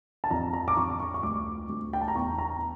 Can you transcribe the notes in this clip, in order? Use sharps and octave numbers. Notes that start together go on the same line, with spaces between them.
A5
F2 A#5
A#5
D6
F2 C#6
C#6
C#6
D2 D6
D2
G5
A5
A#5
E2 C#6
A#5